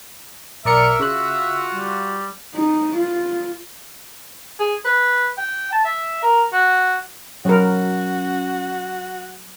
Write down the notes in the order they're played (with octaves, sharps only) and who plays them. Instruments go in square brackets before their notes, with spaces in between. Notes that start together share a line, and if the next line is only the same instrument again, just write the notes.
[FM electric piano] B1 D5 C#7 [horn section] A#4 [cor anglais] E5
[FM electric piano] C#3 F#6 [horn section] F4 F#4
[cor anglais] G3
[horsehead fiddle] D#4
F4
[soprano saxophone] G#4
B4
G5
A5
E5
A#4
F#4
[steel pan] F#3 A#4 [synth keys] C#4 [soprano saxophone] F#4